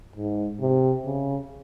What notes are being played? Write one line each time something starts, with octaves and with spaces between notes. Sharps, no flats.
G#2
C3
C#3